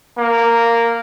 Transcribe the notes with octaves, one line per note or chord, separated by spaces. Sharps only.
A#3